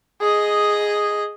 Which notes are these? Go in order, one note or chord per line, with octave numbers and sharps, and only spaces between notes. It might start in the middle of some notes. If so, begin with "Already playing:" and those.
G#4 D#5